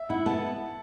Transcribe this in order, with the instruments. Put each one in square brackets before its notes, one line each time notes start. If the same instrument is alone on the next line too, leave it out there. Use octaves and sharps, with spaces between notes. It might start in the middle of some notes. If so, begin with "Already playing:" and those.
Already playing: [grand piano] E5
[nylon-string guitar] E4 [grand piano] F#5
[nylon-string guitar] B3 [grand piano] A5